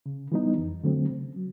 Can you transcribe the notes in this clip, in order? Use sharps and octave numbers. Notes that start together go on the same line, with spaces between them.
C#3
E3 G3 B3 D#4
F2
D3 F#3 A3 C4
C#3
F#3